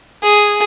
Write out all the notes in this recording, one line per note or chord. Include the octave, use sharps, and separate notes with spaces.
G#4